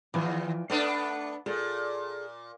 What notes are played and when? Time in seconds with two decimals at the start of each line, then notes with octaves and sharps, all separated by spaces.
0.14 D#2 E3 F3 G#5
0.70 A3 B3 D4 D5
1.46 A#2 G#4 A4